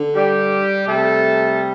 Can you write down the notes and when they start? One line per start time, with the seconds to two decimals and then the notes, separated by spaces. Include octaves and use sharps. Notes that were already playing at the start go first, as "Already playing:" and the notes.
Already playing: D3
0.15 G3 G4
0.86 C3 G3 A3 A4